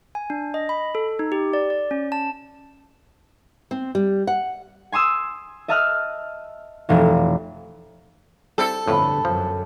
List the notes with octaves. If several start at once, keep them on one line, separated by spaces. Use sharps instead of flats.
G#5
D4
D#5
B5
A4
D#4
G4
D5
D5
C#4
A5
C4
G3
F#5
G#5 C6 D#6 E6
D#5 E5 A5 D#6 F6 F#6
F1 B2 E3
G3 C4 E4 A4
G1 F2 A2 D3 A3 B4
F#2 F3